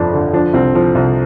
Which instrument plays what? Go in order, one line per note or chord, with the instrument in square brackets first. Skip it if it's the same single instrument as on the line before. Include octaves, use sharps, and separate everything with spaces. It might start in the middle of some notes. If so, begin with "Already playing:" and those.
Already playing: [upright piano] G1 F2 D3 F3 D4
D3
F3 D4
C2 C4
F3
C2